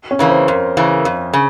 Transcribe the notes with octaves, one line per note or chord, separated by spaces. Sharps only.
C#4
C#3 E3 A#3
C5
F2 A#4
C#3 E3 A#3
F2
C#3